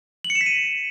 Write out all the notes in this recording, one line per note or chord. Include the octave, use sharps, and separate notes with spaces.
F#7
C#7
E7
B6
D#7